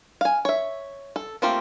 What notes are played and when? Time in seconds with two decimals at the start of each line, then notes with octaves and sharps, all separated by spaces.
0.21 F5 G#5
0.45 C#5 E5
1.16 A4
1.42 A3 A#3 C4 F4 G4